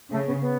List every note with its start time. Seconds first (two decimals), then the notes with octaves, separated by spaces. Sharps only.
0.11 C#3 A3
0.26 B3
0.41 B3